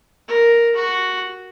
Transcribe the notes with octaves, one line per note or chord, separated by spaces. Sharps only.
A#4
F#4